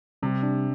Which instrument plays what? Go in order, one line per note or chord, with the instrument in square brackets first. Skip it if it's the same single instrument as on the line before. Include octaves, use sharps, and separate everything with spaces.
[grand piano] C3 [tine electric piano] G3
[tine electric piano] D4